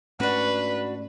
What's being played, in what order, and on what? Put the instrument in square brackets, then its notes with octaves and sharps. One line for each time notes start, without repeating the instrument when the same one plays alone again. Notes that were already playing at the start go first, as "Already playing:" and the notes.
[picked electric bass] G#2 A3 C#4 [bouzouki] D4 F#4 [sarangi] B4